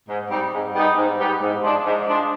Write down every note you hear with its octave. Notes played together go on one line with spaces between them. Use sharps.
G#2
G3 C4 D#4
G#2
G3 B3 D#4 G4
G#2
G3 B3 D#4 G4
G#2
F3 G#3 D4
G#2
F3 G#3 D4